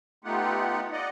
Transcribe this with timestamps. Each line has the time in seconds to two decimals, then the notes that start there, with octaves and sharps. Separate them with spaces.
0.24 A3 B3 D#4 F4 G4 F#5
0.92 D5 D#5 F#5